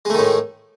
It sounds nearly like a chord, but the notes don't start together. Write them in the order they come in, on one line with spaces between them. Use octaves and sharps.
G#3 A3 D#3 A2